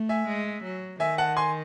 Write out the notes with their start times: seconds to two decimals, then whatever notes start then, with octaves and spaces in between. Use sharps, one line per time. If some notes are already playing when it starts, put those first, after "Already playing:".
Already playing: A3
0.09 E5 G#5
0.27 G#3
0.64 F#3
1.00 D#3 E5 G#5
1.18 F#5 A5
1.37 G#5 C6